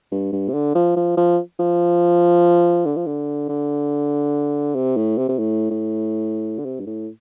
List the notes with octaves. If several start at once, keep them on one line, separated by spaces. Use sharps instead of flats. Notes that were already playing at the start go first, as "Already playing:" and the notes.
G2
G2
C3
D3
F3
F3
F3
F3
D3
F3
D3
D3
C3
A2
C3
C3
A2
A2
D3
C3
G2
A2